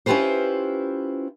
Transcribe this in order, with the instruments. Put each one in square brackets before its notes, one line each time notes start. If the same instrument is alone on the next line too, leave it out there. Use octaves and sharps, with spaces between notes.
[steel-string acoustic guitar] C#4 E4 F4 G4 B4 C5